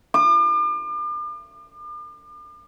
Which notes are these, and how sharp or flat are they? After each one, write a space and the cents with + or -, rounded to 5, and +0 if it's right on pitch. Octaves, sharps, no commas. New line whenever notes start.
D6 +40